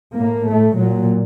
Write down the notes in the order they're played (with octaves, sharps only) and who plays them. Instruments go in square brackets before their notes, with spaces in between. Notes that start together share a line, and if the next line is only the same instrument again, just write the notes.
[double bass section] A2 A#3
A2 A3
A#2 F#3